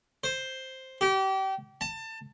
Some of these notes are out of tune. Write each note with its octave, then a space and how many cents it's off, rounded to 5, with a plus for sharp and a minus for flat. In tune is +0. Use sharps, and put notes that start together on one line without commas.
C5 +5
G4 -30
A5 +25